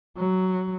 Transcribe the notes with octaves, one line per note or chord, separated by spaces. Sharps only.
F#3